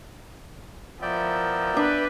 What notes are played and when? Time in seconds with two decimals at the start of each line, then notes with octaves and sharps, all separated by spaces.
1.02 F3 B3 E4 A#4 D5 E5 G5
1.77 D4 B4